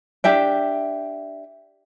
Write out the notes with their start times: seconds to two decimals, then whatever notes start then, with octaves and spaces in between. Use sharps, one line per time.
0.24 D4 G4 E5 G5